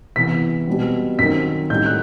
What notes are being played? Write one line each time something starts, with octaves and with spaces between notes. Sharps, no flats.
C3 E3 B3 B6
B2 G3 C4
F#2 D#3 F#3 C4 D#4 B6
A2 G3 D#4 G6
F#6